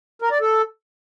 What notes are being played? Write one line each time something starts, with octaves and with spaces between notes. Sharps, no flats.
A#4
D5
A4